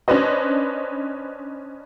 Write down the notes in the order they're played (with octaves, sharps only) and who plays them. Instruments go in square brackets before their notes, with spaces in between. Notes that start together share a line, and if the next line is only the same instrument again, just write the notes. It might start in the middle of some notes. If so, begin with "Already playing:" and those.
[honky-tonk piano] C#4 D4 B4 C5 D#5